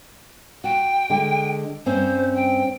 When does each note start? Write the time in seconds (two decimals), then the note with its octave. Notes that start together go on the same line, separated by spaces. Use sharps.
0.64 F#4 G5
1.10 D3 G#3
1.86 G2 C4 C#4 C5
2.35 G5